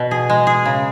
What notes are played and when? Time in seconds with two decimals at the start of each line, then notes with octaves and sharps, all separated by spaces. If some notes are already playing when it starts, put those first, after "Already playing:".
Already playing: B2
0.11 G#4
0.30 G#3
0.47 G#4
0.65 C#3